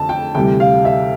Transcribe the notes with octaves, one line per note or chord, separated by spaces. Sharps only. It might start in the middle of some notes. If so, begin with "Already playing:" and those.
Already playing: F2 D3 A5
G5
D2 C3 E3 G3 G5
F5
E5